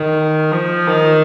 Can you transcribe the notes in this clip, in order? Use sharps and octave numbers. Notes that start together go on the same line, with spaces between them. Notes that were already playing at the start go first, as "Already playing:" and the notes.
Already playing: D#3
F3
D#3